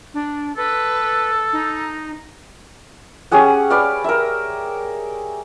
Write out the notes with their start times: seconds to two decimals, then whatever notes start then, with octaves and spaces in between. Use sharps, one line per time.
0.14 D4
0.57 A4 B4
1.53 D#4
3.31 C#4 G4 G#4 F#5
3.70 B4 D5 F5
4.04 A#4 E5